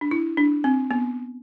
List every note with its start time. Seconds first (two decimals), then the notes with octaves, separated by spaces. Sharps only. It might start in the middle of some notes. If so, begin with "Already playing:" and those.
0.01 D4
0.11 E4
0.37 D4
0.64 C4
0.91 B3